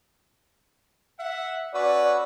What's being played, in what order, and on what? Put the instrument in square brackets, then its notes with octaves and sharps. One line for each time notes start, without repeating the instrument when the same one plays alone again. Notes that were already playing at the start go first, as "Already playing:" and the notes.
[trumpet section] E5 F#5
[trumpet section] C#4 B4 [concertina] F#4 F#5 E6 [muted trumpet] D5